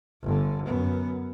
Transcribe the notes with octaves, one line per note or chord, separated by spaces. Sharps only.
G1 D3
F#2 B3